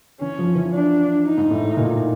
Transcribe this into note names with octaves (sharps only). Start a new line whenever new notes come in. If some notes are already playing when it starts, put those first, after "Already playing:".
E3 C#4
F3
E3
D4
D#4
G#2
A2
A2
A#2